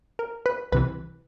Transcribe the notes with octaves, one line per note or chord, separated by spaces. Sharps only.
A#4
B4
C2 C3 E3 B4